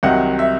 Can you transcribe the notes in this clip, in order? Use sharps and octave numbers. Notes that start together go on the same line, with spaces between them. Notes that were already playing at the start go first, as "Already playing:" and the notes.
C2 C3 D#3 F#3 F#5
E5